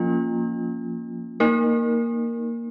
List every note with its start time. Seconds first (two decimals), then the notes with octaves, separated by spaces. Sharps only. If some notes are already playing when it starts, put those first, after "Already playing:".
Already playing: F3 A#3 C#4 F4
1.40 A#3 D#4 A#4